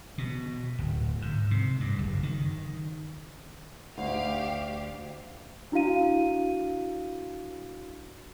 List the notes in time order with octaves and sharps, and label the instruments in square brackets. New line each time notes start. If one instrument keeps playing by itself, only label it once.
[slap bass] B2
D1
G#2
C3
G2
F#1
D#3
[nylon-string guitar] D2 [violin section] G4 F5
[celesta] D4 E4 F#4 F5 D#7